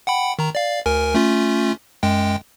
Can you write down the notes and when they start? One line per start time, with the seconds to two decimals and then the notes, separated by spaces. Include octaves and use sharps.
0.07 F#5 G5 B5
0.39 D#3 A#5
0.55 D5 F5
0.86 D2 A#4 G#5
1.14 A3 C#4 F4
2.03 F#2 G#3 G5